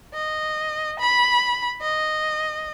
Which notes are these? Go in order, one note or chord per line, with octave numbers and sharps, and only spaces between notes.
D#5
B5
D#5